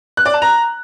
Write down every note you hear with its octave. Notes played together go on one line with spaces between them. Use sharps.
F#6
D5
A5
A#5